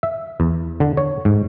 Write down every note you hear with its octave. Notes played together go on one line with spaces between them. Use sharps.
E5
E2
D3
C#5
G#2